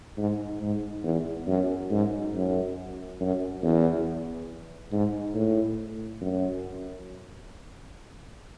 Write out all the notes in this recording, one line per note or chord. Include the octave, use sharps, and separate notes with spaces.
G#2
G#2
E2
F#2
G#2
F#2
F#2
E2
G#2
A2
F#2